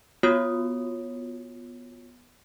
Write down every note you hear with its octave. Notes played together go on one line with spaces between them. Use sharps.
B3 F4 F#4 C#5 D#6 C7